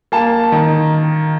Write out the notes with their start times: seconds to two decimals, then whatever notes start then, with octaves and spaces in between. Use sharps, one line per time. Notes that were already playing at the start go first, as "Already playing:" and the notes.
0.12 A#3 A5
0.52 D#3